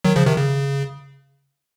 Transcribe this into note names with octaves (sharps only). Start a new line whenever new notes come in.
D#3 F#3
C#3 F3
C3 D#3
C#3